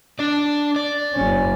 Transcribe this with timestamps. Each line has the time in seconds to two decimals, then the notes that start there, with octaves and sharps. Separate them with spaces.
0.19 D4 D5
0.76 D5
1.14 F#1 C#4